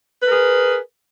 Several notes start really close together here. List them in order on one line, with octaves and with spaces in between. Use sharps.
B4 A#4 G#4